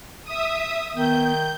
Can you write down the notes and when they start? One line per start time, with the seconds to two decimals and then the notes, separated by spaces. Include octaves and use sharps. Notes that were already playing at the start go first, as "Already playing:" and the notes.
0.24 E5 D#6
0.95 D#3 B3 G6